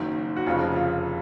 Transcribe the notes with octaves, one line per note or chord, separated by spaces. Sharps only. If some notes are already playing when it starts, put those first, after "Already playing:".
Already playing: F#1 F#2 D#3
F#4
F1 F2 C#3 F3 F4
F4